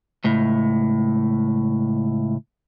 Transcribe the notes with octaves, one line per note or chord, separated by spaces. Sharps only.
C#2 A2